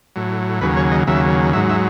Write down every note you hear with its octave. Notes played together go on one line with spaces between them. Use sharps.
A2 F#3
D#2 C#3 F#3 B4
C#5
D#5
D#2 C#3 F#3 E5
G#2 F#3 E5
E5